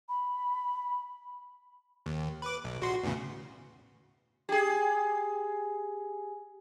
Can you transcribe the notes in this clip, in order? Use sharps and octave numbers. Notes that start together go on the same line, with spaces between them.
B5
D#2
B4 D6
B1
A#1 F#4 C6
E2 A2 C#3
G4 G#4